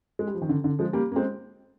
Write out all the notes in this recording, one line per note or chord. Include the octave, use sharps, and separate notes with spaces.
G#3
G3
F3
D#3
D3
D3
F3 G#3
G3 A#3
A#3
G#3 C4